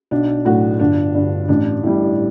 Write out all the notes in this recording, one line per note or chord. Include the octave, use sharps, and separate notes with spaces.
B1 D4
A2 F#3 A3 F#4
G1 D4
G2 D3
A1 D4
A2 G3 E4